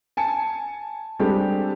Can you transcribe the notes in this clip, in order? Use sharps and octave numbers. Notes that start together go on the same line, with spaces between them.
G#5 A5 C#7
G3 G#3 C4 D4 G4 A4